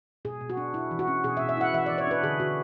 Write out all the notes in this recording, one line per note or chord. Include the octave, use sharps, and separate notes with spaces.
B2 G#4
B2
F#4
D4
E4
E3
F#4
C#4
B2 G#4
E5
B2
E5
E4 F#5
E3 E5
D5
E3
C#5
D4 B4
D3 G#4
D3 F#4